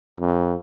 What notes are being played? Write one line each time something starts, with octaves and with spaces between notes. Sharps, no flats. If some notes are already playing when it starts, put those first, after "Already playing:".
F2